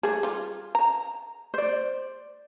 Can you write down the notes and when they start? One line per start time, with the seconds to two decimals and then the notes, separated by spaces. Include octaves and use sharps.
0.03 G3 A3 G#4
0.23 G3 F4
0.75 A#5
1.54 C5 D5